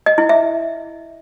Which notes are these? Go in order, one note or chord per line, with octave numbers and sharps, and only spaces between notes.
D#5
E4
E5